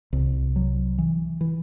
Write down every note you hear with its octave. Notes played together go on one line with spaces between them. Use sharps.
C2
F#3
E3
E3